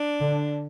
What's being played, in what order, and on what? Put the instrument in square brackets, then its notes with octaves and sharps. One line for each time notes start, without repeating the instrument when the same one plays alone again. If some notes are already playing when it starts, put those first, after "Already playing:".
Already playing: [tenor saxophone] D4
[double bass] D3